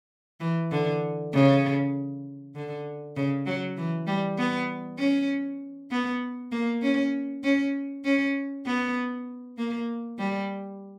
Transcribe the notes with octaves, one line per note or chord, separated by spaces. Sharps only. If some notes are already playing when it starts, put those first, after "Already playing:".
E3
D3
C#3
D3
C#3
F#3
E3
G3
B3
C#4
B3
A#3
C#4
C#4
C#4
B3
A#3
G3